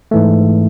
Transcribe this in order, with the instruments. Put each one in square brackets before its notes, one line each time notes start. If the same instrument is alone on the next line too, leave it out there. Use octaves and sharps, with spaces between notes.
[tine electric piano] G#2 E3 A3